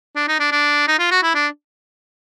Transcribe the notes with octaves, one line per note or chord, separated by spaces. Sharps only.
D4
D#4
D4
D4
D#4
F4
F#4
E4
D4